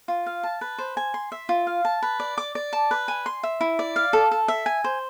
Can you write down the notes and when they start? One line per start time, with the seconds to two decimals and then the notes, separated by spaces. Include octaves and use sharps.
0.08 F4
0.26 F5
0.43 A5
0.61 B4
0.78 C5
0.97 G#5
1.14 C6
1.32 E5
1.49 F4
1.67 F5
1.85 A5
2.02 B4
2.20 D5
2.38 D6
2.55 D5
2.73 A5
2.91 B4
3.08 G#5
3.26 C6
3.43 E5
3.61 E4
3.79 D5
3.96 F5
4.13 A4
4.31 A4
4.48 E5
4.66 G#5
4.84 C5